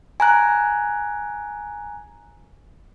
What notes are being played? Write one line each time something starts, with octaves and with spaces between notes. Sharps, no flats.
G#5 A#5 F#6